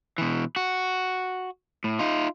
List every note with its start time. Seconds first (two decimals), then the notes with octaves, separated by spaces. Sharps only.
0.18 B2 E3
0.56 F#4
1.84 A2
1.99 D#4 F4